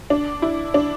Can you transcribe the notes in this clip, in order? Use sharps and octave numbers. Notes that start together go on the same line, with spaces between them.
D4
E4
D4